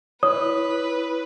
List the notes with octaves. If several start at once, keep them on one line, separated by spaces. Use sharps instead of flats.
E4 B4 C#5 D#6